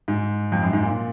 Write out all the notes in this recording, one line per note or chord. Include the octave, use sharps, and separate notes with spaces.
G#2
F2
F#2
G#2
A#2